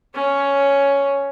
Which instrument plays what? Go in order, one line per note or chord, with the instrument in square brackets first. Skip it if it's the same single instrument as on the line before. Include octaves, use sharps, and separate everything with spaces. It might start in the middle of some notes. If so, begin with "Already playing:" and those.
[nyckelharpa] C#4 C#5